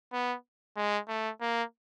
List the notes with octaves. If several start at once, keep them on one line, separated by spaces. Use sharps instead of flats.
B3
G#3
A3
A#3